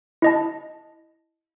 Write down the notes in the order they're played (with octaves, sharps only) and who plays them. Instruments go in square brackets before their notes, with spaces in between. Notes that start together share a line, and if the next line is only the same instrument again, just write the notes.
[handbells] E4 D#5 A5